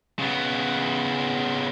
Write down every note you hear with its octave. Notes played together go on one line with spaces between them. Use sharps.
C#3 B3